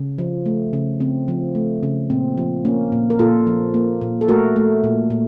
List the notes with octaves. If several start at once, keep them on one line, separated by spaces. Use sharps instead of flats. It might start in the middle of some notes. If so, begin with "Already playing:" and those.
Already playing: C#3
F3
A3
C#3
C#3 C4
F3
A3
C#3
A#2 C4
F3
A#3 C#4
A#2
A#4
A#2 F4 A4
F3
A#3
A#2
A4
A3 F#4 A#4
A3
A#2
A#2